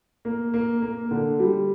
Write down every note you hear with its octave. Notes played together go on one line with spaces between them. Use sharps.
A#3
A#3
A#3
D3
G3